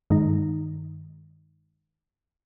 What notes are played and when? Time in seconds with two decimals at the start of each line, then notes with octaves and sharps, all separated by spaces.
0.10 G2 D#3 G#3 D#4